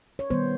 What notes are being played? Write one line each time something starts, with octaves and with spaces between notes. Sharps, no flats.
C#5
D#3 G3 B3 C5